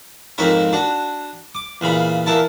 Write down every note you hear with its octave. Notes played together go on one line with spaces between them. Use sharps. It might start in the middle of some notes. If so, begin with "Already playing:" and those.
F2 G#2 A#3 C4 C#5 B5
D4 F#4
D6
E2 A#2 C#3 B5
E2 A#3 E4 A5